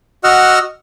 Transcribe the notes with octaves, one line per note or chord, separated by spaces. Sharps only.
F#4 D#5 F#5 E6 F6